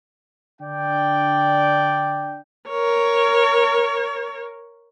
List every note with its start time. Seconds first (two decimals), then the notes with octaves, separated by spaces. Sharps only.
0.61 D3 D4 D5 G5
2.69 A#4 C#5